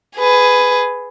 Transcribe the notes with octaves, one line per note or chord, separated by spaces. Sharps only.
G#4 B4